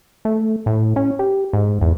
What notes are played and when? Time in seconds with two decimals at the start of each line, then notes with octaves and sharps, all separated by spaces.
0.25 A3
0.66 A2
0.96 C#4
1.19 G4
1.53 G#2
1.82 E2